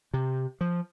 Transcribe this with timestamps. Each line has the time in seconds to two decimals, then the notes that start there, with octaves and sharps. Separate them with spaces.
0.14 C3
0.61 F3